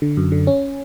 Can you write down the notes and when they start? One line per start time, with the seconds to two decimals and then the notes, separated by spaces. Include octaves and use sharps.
0.02 D3
0.17 F#2
0.32 D3
0.47 C#4